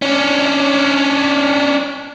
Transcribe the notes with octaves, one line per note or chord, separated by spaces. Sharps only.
C#4 D4